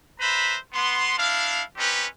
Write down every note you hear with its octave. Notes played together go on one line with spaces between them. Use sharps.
B4 C5 E5 A#5 B5
B3 C6
D4 E4 F5
C4 C#4 D#4 G4 B4